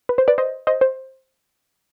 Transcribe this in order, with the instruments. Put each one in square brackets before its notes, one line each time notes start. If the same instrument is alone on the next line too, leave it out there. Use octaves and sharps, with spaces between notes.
[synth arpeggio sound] B4
C5
B4 D5
C5 D#5
C5 D#5
C5